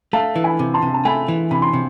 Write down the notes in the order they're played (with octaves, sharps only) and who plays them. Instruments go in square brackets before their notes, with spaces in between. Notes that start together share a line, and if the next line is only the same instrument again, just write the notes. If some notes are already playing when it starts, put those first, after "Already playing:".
[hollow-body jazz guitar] A3 [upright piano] F5 A5
[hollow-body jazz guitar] E3
[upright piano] G#5 B5
[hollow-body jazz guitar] C3
[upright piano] A5 C6
[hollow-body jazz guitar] C3
[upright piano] A5
[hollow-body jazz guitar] A3 [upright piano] G#5 B5
[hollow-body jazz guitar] E3
[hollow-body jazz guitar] C3 [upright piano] B5
[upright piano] C6
[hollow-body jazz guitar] C3